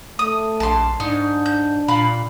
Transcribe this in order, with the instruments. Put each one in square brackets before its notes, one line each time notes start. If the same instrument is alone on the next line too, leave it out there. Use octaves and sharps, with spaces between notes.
[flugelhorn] A3 [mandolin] D#6
[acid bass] A#1 [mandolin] A5 C6
[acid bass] G#2 [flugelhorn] D4 [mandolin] D#4
[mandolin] G6
[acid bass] A#2 [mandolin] F5 B5